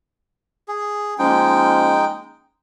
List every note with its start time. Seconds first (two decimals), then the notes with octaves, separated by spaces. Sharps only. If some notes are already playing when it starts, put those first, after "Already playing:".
0.68 G#4
1.19 F3 G#3 A#3 C#4 D#4 G5